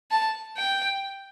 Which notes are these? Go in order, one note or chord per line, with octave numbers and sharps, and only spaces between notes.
A5
G5